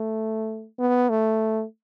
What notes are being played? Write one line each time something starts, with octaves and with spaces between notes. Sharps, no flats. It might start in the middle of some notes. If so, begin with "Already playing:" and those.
Already playing: A3
B3
A3